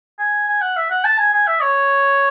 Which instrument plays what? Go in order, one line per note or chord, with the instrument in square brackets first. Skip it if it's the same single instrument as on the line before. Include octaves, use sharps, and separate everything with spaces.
[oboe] G#5
G#5
F#5
E5
F#5
A5
G#5
G#5
E5
C#5